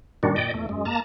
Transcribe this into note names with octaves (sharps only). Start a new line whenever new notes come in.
F#2 A#2 D#3 G3 D4 F#4
A#2 D5 D#5 G5
E2 A3
F#2 G#3
A#3 A5 A#5